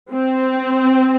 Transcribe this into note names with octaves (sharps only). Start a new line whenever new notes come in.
C4